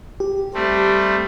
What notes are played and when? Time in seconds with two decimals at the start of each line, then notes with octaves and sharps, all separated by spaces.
0.20 G4
0.54 G3 A3 C4